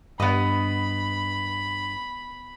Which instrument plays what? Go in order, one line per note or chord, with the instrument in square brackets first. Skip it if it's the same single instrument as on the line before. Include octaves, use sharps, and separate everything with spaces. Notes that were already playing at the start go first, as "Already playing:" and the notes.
[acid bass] G2 [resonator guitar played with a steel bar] B3 D#5 [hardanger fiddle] B5